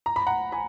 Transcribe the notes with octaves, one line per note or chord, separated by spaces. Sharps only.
A#5
B5
F#5 A#5
G#5 B5